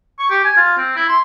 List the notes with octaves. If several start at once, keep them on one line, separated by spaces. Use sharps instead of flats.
C#6
G4
G#5
F4
C4
E4
C6